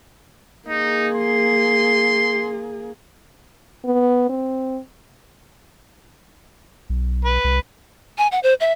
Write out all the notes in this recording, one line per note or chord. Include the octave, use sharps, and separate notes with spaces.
A#3 D#4 G#4
C6
B3
C4
B1
B4
C2
G#5
F#5
C5
E5